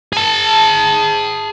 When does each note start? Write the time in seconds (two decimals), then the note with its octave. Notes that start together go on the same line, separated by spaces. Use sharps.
0.13 G#4 A5